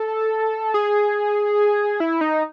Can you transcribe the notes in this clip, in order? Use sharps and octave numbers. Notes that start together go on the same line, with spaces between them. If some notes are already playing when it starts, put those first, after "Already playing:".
Already playing: A4
G#4
E4
D#4